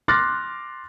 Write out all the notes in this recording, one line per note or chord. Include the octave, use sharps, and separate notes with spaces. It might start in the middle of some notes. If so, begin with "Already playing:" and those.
C6 D6 F6 F#6 A6 A#6